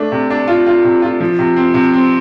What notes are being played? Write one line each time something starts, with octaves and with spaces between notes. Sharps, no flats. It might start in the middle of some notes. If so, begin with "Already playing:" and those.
Already playing: A3 D4
C3
D4
F4
F4
C3
F4
F3
C3
C4
C3
C4